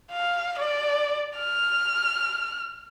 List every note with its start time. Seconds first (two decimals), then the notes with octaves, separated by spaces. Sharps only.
0.12 F5
0.59 D5
1.38 F6